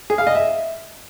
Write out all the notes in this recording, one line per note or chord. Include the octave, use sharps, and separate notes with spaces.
G#4
F5
D#5
E5